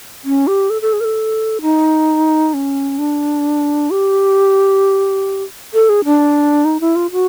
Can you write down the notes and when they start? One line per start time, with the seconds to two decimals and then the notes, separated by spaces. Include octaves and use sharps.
0.24 C#4
0.47 G4
0.70 A4
0.82 A4
0.93 G#4
1.00 A#4
1.05 A4
1.62 D#4
2.54 C#4
2.98 D4
3.91 G4
5.74 A4
5.89 G#4
6.05 D4
6.65 D#4
6.80 E4
6.96 F4
7.12 F#4